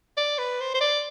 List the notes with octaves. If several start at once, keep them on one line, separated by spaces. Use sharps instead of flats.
D5
B4
C5
C5
D5